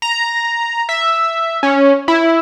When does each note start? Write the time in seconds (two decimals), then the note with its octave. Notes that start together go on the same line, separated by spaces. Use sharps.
0.02 A#5
0.89 E5
1.63 C#4
2.08 E4